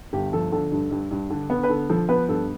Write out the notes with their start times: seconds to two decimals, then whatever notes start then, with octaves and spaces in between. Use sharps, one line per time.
0.13 G1 G4
0.33 F3 A4
0.52 D3 A4
0.72 G2
0.91 G2
1.11 G2
1.30 D3
1.50 B3
1.63 B4
1.69 D3 A4
1.89 F3 A4
2.09 B3 B4
2.28 G2 A4